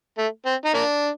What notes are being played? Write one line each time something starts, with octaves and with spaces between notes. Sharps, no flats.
A3
C4
D#4
A#3 D4